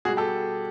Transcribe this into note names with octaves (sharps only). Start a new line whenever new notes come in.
B2 G3 F#4 G#4
G4 A4